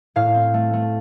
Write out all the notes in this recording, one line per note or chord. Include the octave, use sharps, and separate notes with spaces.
A2 F5
C4
A3
A3